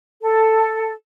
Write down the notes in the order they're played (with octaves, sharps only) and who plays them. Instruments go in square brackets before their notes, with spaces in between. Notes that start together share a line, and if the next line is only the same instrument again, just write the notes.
[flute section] A4